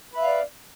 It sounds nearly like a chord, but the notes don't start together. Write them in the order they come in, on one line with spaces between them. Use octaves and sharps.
B4 E5 F5 D5